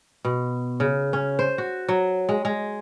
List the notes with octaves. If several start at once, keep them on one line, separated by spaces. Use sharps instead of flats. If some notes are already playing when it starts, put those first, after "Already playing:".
B2
C#3
C#4
C5
F#4
F#3
G#3
G#3